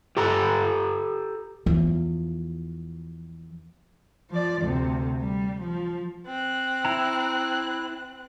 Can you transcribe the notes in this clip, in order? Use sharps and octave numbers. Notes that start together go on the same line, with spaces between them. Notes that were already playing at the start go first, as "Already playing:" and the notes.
G4 A4 A#5
E2 F3
F3 D5
D2 C3
G3
F3
C4 F#6
E4 A#5